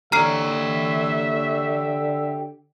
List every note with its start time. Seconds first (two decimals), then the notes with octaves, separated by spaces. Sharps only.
0.12 D3 G4 C#5 E5 A#5 F6 C7